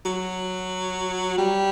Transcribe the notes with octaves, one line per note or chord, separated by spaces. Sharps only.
F#3
G3